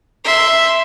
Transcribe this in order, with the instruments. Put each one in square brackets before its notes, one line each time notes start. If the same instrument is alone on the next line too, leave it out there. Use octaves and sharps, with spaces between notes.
[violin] E5 C6